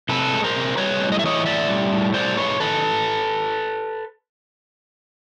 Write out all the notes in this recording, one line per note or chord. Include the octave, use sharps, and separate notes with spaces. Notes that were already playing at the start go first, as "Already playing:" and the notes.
C3 A4 B4
G#3
A#4 C5
C3
G3 B4 C#5
A2
D#5
E5
E3 C#5 D#5
A2 D5 E5
G3
A2
G3 C5 D5
G#2 B4 C#5
D#3 A4 B4